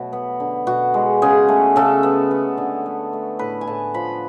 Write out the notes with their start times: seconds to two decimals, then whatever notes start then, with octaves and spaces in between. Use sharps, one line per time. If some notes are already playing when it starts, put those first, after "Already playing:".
Already playing: B2 F#3 A3 F#4 B4
0.13 B3
0.40 D3
0.67 B2 F#4
0.94 G#3
1.22 C#3 G#4
1.49 A3
1.76 C#3 A4
2.03 B3
2.31 B3
2.58 D3
2.86 A3
3.13 A3
3.39 A2 B4
3.61 G#5
3.67 A2 A5
3.94 F3 B5